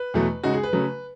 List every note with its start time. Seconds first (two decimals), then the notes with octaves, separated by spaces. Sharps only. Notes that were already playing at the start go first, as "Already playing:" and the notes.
Already playing: B4
0.14 E2 B2 F#3 A3
0.43 C#3 G#3 D#4 F#4
0.53 G#4
0.63 B4
0.73 C#3 F#3 A3